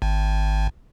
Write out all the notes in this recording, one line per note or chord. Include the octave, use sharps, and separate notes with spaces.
G#1